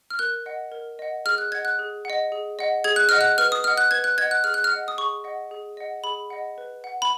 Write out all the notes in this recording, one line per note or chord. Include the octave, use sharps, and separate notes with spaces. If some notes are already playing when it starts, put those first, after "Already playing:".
F6
A#4 F#6
D#5 F#5
A#4
D#5 F#5
G#4 F6
F#6
D#5 F#5 G#6
F#6
G#4
D#5 F#5
G#4
D#5 F#5
G#4 G#6
F#6
D#5 F#5 F6
F#6
B4 F6
D#6
D#5 F#5 F6
F#6
B4 G#6
F#6
D#5 F#5 G#6
F#6
G#4 F6
F#6
F6
D#5 F#5
D#6
G#4 C#6
D#5 F#5
G#4
D#5 F#5
G#4 B5
D#5 F#5
B4
F#5
B5